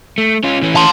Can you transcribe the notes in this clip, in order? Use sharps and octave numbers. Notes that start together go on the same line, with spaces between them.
A3
C#4 F4
E3 C#4
A5 C6